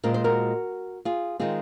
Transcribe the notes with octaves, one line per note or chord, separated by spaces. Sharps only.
A#2 G#3 C4 A#4
C5
F#4 A#4
F4 G#4
D#3 G#3 C4 F4 G#4